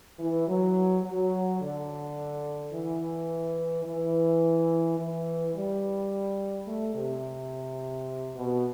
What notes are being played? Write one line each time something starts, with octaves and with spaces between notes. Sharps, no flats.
E3
F#3
F#3
D3
E3
E3
E3
G3
A3
C3
B2